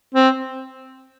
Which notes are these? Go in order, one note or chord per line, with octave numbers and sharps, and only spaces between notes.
C4